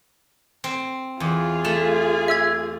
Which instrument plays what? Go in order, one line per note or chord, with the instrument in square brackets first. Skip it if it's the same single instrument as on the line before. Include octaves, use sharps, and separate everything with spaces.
[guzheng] C4
[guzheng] E2 [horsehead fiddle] F4 G#4
[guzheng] A3 [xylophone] E7
[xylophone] E5 E6 G#6